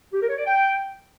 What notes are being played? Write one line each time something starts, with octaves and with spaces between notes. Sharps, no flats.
G4
A#4
C#5
D5
G5